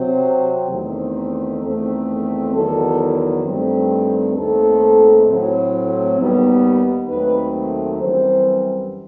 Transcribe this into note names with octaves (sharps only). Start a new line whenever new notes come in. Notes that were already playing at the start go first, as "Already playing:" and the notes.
Already playing: C3 F#3 C4 C5
E2 D#3 A3 C4
E2 D#3 A3 C4
E2 D#3 F#3 A4
G2 D#3 A3 C4
D#2 D#3 A3 C4 A4
A2 F#3 C4
D#2 D#3 G3 B3
D#2 D#3 F#3 A3 C4 B4
F#2 E3 G3 C4 C5